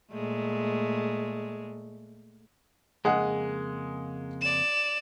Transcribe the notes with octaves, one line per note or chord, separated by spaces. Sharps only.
A#2 G#3 A3
F2 C#3 G#3 A#3 G#4 F#5
D5 E7